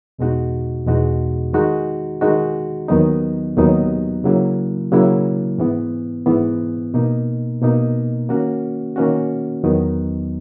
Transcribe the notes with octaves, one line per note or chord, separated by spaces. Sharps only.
E2 B2 G#3 D#4 F#4
E2 B2 G#3 D#4 F#4
D#3 G#3 D#4 F#4
D#3 G#3 D#4 F#4
D#2 D#3 F#3 B3 D#4
D#2 D#3 F#3 B3 D#4
C#3 F#3 A#3 E4
C#3 F#3 A#3 E4
G#2 E3 B3
G#2 E3 B3
B2 A#3 D#4
B2 A#3 D#4
D#3 A#3 C#4 F#4
D#3 A#3 C#4 F#4
E2 D#3 F#3 B3 D#4